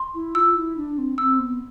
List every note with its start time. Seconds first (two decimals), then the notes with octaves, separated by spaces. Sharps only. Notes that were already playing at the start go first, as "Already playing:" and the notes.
Already playing: C6
0.14 E4
0.35 F4 E6
0.56 E4
0.77 D4
0.98 C4
1.18 C4 E6
1.39 B3